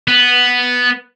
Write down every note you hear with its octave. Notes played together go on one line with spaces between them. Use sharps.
B3